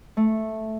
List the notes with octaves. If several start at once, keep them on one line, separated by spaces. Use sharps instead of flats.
A3